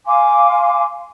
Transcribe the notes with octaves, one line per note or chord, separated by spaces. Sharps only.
F5 G#5 C6 D6